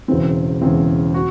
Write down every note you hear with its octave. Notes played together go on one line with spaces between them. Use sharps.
E1 E2 C#3 E3 C4
E1 E2 C#3 E3 C4
F#4